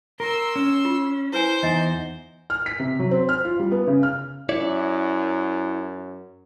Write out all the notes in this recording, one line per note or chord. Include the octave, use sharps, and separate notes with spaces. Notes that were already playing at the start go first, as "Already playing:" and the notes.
A#4 C6 E6
C#4
F4
E4 B4 C5 G#5
E2 D#4 D#5 E5 G#5
F6
B6
C3
F#3
C4
F6
F4
G3
B3
C#3
F6
F#2 E4 C#5 D5